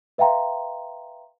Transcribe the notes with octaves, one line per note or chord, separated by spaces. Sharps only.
B4 E5 F5 G5 A#5 C6